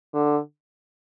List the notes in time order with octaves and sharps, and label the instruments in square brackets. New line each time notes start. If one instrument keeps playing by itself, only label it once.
[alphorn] D3